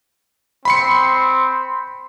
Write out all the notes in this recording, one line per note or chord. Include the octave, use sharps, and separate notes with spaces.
C4 B5 C6 C#7